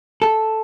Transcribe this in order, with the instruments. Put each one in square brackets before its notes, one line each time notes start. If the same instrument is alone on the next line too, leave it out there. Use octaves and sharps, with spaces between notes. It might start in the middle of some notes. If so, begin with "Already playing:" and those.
[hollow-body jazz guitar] A4